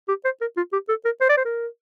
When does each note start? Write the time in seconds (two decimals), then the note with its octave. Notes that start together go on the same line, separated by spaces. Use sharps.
0.08 G4
0.25 C5
0.41 A#4
0.57 F4
0.73 G4
0.89 A4
1.05 A#4
1.21 C5
1.29 D5
1.37 C5
1.45 A#4